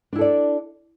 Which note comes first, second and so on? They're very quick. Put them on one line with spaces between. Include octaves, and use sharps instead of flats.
D4 E4 A4 D5